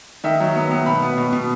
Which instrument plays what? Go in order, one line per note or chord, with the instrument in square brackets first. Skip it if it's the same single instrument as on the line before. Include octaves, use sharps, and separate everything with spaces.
[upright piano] D#3 E5
F#3
B3
B3
B2 B5
B3
B2
B2